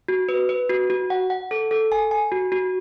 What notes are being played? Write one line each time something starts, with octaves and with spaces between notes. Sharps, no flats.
F#4
B4
B4
F#4
F#4
F#5
F#5
A4
A4
G#5
G#5
F#4
F#4